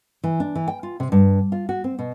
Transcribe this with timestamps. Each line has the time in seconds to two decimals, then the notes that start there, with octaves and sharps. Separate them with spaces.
0.24 E3
0.40 D4
0.55 E3
0.68 G5
0.83 F4
1.00 C3
1.12 G2
1.52 F4
1.69 F#4
1.84 C4
1.99 B2